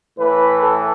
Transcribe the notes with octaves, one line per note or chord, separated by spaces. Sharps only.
A2 E3 A3 B4
A4